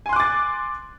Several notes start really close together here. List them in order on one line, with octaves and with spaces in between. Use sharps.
G#5 C6 F#6 D6 A6